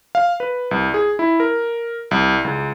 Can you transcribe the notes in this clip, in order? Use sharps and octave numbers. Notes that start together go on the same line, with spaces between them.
F5
B4
C2
G#4
E4
A#4
C2
C#2